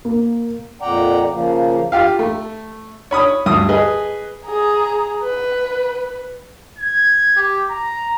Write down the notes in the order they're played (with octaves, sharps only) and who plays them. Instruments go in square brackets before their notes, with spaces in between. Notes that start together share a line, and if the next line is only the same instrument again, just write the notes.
[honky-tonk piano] A#3
[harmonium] F2 A#2 D5 F#5 G5 A#5
C#3 F3 A#3
[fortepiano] F4 G4 F5
A3
C#5 B5 D#6
D2 G2 D#6
G#4 B4 D#5
[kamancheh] G#4 A#5
B4
[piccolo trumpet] G#6
G4
A#5